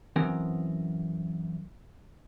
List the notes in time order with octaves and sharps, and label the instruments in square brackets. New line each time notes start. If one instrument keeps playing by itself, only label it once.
[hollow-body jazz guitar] F#2 E3 B3 C4 A#4 F#5